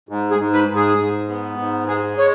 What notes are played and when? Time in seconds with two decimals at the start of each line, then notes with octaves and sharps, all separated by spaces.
0.09 G#2
0.31 G#4
0.39 G#2
0.53 B4
0.68 G#2
0.76 G#4
0.98 G#2
1.28 B3
1.58 G#2
1.88 G#3 G#4
2.18 C#5